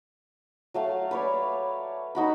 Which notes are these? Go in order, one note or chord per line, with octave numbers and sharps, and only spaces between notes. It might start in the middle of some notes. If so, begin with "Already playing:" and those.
F#3 A3 F5
B4 C#5 D5
D#4 F#4 B5